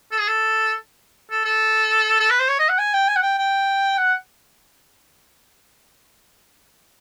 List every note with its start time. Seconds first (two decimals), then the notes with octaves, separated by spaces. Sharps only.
0.12 A4
0.20 G#4
0.28 A4
1.31 A4
1.45 A4
2.20 A4
2.30 B4
2.40 C5
2.49 C#5
2.59 D#5
2.69 F#5
2.79 G#5
2.94 G5
3.08 G#5
3.16 F#5
3.23 G5
3.38 G5
3.98 F#5